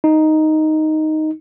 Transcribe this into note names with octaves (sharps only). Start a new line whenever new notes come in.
D#4